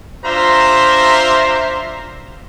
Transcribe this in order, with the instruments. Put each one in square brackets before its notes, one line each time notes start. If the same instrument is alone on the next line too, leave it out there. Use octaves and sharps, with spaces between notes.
[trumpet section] D4 F4 C5 E5 A#5 C6